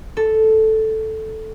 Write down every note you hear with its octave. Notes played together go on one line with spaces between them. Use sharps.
A4